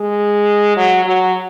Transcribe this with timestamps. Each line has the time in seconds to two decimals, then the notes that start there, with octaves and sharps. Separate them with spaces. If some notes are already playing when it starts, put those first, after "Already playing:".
Already playing: G#3
0.77 F#3
1.06 F#3